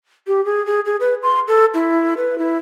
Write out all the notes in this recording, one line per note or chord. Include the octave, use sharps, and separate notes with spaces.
G4
G#4
G#4
G#4
B4
C6
A4
E4
B4
E4